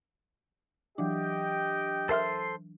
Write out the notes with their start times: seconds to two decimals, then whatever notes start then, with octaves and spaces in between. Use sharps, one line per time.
0.98 E3 F#3 D4 G4 D#5 G5
2.09 A4 A#4 C5 E5 C6 F6